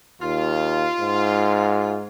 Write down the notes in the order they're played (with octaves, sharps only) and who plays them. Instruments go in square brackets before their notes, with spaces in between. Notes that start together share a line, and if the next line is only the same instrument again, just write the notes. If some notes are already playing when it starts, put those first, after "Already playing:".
[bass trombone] D#2 [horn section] F4
[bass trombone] G#2